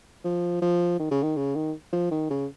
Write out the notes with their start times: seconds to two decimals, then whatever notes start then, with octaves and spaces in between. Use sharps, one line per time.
0.24 F3
0.62 F3
0.99 D#3
1.11 C#3
1.23 D#3
1.37 C#3
1.55 D#3
1.93 F3
2.11 D#3
2.30 C#3